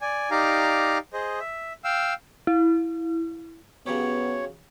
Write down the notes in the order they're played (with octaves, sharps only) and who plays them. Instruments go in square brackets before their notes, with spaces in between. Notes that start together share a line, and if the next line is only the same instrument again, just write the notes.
[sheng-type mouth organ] D5 G#5
D#4 G4 D5 F5 A#5
G#4 C5 D#5
E5
F5 G5 E6
[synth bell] E4
[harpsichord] C#3 F#3 G4 [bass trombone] B3 [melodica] C#5